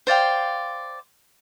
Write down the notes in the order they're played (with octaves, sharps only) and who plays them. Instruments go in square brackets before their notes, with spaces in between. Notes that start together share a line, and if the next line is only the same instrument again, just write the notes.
[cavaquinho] C5 D5 F5 G5